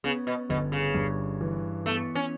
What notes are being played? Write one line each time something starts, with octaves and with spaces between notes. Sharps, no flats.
C#3 B3
B2
G1 B2
C#3
G2
E3
A3 B3
C#4